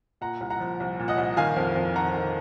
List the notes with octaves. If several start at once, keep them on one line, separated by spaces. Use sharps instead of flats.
A#2 F#5 A#5
C2
F#5 A#5
F3
C2
A#2
D#5 F#5
C2
D#3 F5 G#5
F2
F2
D#3 F#5 A#5
D#3